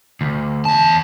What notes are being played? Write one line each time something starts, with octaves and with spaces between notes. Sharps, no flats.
D2
E2 A5